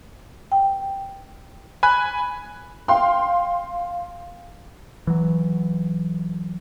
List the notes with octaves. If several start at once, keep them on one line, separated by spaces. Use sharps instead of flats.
G5
G#5 B5 F#6
F5 G5 C6
E3 F#3